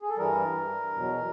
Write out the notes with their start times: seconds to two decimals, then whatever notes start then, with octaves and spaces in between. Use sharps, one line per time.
0.02 G#4
0.10 A4
0.17 G2 E3 G3 A#4
0.93 E2 B2 F#3